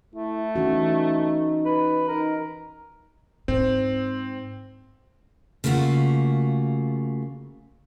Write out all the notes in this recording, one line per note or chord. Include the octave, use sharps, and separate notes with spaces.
A3 E4
E3 C#4 D#4 F#4
B4
D#4 A#4
G#2 C4
C#3 A3 A#3 F4 F#4